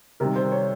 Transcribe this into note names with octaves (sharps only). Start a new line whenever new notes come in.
C3 D#3 G3 A#4
C5
C#5